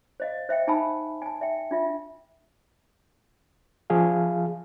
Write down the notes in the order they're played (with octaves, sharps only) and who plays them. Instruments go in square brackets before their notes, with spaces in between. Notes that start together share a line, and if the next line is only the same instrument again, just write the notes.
[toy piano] C5 D#5 F5
C5 E5 F5 G5
D#4 G#5 A5 B5 E6
G#5 A5
E5 G5
D4 F4 E5
[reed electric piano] F3 G#4 F5